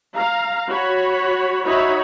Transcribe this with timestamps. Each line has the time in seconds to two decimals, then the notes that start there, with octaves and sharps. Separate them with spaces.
0.16 F5 A#5
0.70 F#4 C#5 B5
1.65 D#4 F#4 C#5 E5 B5